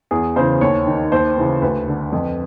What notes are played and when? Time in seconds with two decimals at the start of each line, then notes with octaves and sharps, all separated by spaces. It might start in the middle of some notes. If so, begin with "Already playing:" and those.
0.11 E2 G#4
0.36 C#3 E3 C5
0.61 D#2 C#5
0.87 D#3
1.12 D#2 C5
1.37 C#3 E3
1.62 D2 B4
1.87 D3
2.12 F2